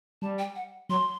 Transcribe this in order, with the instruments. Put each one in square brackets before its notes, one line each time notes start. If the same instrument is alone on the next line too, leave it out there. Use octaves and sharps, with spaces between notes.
[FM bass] G3 [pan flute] A5
[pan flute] G5
F#5
[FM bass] F#3 [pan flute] C6